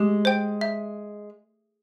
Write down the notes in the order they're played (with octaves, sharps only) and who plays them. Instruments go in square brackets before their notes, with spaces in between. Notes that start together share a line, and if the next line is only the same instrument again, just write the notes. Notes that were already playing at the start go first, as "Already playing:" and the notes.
Already playing: [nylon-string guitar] G#3 [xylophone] G4
[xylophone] C5 G5
E5